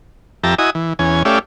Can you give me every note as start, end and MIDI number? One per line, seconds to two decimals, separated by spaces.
0.43 0.55 41
0.43 0.55 67
0.43 0.55 76
0.43 0.55 81
0.43 0.55 82
0.59 0.70 64
0.59 0.70 66
0.59 0.70 75
0.59 0.70 80
0.59 0.70 87
0.75 0.93 52
0.99 1.23 40
0.99 1.23 61
0.99 1.23 80
1.25 1.39 57
1.25 1.39 61
1.25 1.39 67
1.25 1.39 74
1.25 1.39 76
1.25 1.39 77